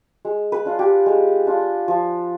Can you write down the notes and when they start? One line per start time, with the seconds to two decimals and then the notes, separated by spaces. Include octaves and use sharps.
0.25 G#3
0.52 B4
0.65 D4 F4
0.79 G4
1.06 G#3
1.47 D4 F4
1.88 F3